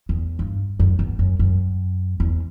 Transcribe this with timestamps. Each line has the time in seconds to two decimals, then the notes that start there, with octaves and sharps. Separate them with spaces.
0.09 E2
0.39 G2
0.80 F#2
0.99 E2
1.19 F#2
1.39 F#2
2.20 E2